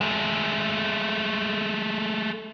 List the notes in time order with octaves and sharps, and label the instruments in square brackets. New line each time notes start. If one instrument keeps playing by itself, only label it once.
[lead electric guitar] G#3 A3